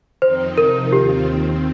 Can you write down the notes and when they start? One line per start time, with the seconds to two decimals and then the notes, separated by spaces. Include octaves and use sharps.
0.22 F2 D#3 C4 D#4 C5
0.57 C3 F3 D#4 A#4
0.93 D#2 D#3 C4 F4 G4
1.27 D#2 D#3 C4